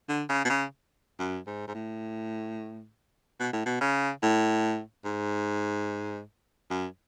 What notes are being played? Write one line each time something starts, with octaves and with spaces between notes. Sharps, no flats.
D3
C#3
B2
C#3
F#2
G#2
G#2
A2
B2
A2
B2
C#3
A2
G#2
F#2